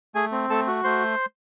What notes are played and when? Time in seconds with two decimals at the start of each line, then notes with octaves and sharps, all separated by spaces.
0.15 A3 G#4 G#5
0.32 C4
0.50 A3 A4 A5
0.67 F#4
0.84 A3 C5 C6